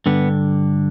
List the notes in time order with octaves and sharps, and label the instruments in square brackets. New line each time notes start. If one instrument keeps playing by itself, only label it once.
[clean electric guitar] G2 D3 B3